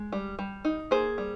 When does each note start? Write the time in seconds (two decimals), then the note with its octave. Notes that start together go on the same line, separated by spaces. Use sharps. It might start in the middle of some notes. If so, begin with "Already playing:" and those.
Already playing: G#3
0.12 G3
0.39 G3
0.65 D#4
0.91 A#3 G#4 C5
1.18 G3